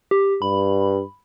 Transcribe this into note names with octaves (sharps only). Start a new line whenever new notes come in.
G4
G2 B5